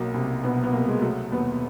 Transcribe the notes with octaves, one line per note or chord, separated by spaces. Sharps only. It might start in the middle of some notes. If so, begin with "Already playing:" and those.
Already playing: B1 F#3 A#3
C2
B2 B3
B3
C2 A#3
G#3
F#3 A3
D#2 B3